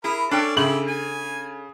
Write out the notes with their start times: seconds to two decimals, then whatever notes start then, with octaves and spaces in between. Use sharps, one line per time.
0.04 E4 G#4 A#4 A#5 B5
0.31 C#4 D4 A4 D5 G5
0.56 C#3 E4 G4 C6 F#7
0.87 G#5